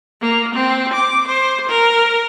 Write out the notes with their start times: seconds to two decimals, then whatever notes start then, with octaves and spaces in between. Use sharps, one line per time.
0.22 A#3
0.55 C4
0.94 D6
1.28 C5
1.69 A#4